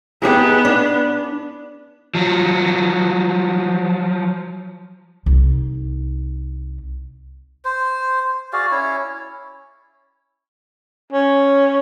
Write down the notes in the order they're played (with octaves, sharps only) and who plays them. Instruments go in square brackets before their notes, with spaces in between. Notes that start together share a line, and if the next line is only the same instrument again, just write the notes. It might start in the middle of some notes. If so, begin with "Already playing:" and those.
[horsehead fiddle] B3 [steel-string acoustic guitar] D#4 G4 G#4
[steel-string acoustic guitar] D4
[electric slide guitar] F3 F#3
[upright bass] C2 D#4
[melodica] C5
F#4 G#4 D5 F5
C#4 E4 C#5
[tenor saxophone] C#4